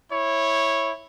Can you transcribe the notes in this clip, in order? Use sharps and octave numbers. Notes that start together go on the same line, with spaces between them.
E4 C#5